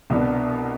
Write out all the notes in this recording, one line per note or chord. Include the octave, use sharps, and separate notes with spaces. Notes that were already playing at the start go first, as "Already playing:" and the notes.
C2 B2 B3 D4